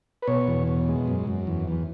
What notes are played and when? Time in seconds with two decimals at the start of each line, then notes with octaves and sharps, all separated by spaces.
0.22 B4
0.27 B2 C#5
0.48 E2
0.67 B2
0.88 G#3
1.08 F#2
1.27 F#2
1.47 E2
1.67 E2